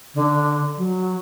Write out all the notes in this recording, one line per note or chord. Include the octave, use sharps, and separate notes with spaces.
D3
F#3